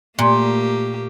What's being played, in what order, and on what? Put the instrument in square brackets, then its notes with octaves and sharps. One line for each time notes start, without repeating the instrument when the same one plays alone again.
[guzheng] A#2 [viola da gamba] A3 A#3 G4